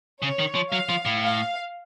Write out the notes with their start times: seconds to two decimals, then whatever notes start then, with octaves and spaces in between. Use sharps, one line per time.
0.22 C#3 C#5
0.39 D#3
0.55 F3
0.72 F#3 F5
0.89 F3
1.05 A2
1.22 F5